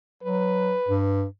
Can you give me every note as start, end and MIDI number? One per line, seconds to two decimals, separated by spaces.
0.23 0.74 54
0.23 1.01 71
0.88 1.25 43